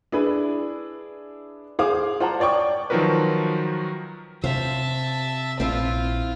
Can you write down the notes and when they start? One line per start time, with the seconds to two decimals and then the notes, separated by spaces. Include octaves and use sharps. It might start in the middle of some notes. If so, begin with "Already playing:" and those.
0.12 D4 E4 G#4 B4
1.79 G#4 C5 F5 D6
2.20 F4 C5 F#5 A5 A#5
2.40 C#5 D5 G5 C#6 D6
2.90 D#3 F3 F#3 F#4 A#4 B4
4.44 C3 C5 E5 F5 A5
5.60 A#1 C4 E4 F4